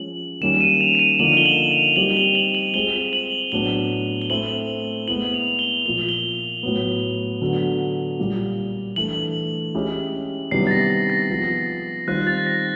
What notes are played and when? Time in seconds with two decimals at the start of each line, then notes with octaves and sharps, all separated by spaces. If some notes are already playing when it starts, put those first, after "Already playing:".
Already playing: F3 G#3 C#4 F4 G#4 F#7
0.41 D#3 G3 A#3 C#4 E7
0.60 D#7
0.81 F7
0.95 D#7
0.99 E7
1.19 D3 F3 A#3 D#4 F#7
1.37 G7
1.45 F#7
1.71 F7
1.96 G3 C4 D#4 G4 F#7
2.17 G7
2.35 F#7
2.55 F#7
2.74 G#3 C4 F4 G#4 G7
3.13 F#7
3.52 A2 F#3 B3 D4 G7
4.22 G7
4.30 A3 C4 E4 F#7
5.08 G#3 B3 E4 F#7
5.34 F7
5.59 G7
5.85 A#2 F3 A#3 G7
6.09 G7
6.63 A2 F#3 B3
7.42 D3 F#3 B3
8.19 A#2 G3 A#3
8.96 E3 A3 D4 F#7
9.75 G#3 C#4 E4 G4
10.51 C3 D#3 G3 B3 E4 C7
10.67 A6
10.71 A#6
10.90 A#6
11.10 A#6
11.30 F3 G#3 B3
12.07 D#3 G3 C4 F4 F#6
12.27 A6
12.47 A#6